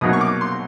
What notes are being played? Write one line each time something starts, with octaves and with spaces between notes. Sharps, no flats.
C2 B2 F#3 A#3 D#4 D#6
C#6
D6
C6